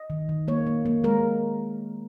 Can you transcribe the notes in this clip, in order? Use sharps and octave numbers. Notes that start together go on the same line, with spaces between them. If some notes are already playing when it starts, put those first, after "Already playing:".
Already playing: D#5
D#3
D#3
A#3 C#5
A#3
A#3
G#3 A#4